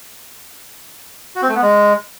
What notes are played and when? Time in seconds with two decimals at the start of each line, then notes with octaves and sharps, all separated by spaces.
1.36 F#4
1.42 C4
1.49 A3
1.55 B3
1.62 G#3